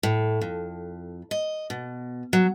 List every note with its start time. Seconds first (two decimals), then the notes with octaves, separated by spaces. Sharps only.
0.03 A2
0.41 F2
1.31 D#5
1.70 B2
2.33 F#3